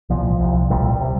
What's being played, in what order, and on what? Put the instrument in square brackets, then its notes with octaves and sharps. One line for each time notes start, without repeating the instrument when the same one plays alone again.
[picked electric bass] C2 A#2 F3
C2 C3
C2 A#2 G3
C3